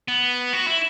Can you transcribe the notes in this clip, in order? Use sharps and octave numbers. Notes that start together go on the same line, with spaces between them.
B3
F#4
E4